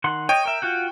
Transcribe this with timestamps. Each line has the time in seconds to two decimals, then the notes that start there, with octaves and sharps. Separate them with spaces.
0.04 D#3 F#5 C6
0.29 C#5 D#5 G5
0.45 A#4 E5
0.62 F4 F#4 F#5